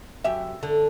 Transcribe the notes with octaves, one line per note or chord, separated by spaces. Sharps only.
F#2 G4 E5
D3 A4